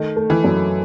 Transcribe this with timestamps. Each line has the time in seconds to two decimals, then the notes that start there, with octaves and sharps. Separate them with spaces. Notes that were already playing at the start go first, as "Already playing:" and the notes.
Already playing: D#3 A3
0.16 A3
0.30 E3
0.44 F#2